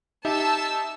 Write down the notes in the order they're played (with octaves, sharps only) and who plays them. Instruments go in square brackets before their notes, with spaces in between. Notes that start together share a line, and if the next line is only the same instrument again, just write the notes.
[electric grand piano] D#4 G4 E5 [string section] A5 E6